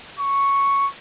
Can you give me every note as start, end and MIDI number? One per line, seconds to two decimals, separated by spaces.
0.20 0.88 85